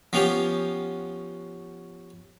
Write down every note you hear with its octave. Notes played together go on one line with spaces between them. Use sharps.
F3 B3 C#4 F4 G4